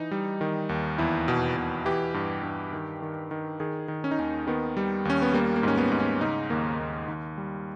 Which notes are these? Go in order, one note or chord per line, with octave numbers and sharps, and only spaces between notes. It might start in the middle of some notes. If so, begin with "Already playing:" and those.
Already playing: E3 D#4
G3
D#3
D#2
E2 E4
B2
B2
E3 G4
G2
G2
D#3
D#3
D#3
D#3 G#4
D#3
C#4
D#4
D#2 C#4
D#3 B3
G3
D#2 C#4
B3
G3 A#3
A#3
G#2 C#4
B3
G#2
C#4
C#3 D#4
D#2 A#3
D#2
D#2
G3